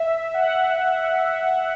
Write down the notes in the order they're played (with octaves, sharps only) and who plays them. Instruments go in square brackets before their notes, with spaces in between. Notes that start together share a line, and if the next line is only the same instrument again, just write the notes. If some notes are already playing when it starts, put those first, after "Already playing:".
Already playing: [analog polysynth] E5
F#5